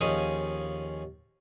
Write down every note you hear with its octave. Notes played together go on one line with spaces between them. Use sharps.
D#2 F3 C#4 G#4 D#5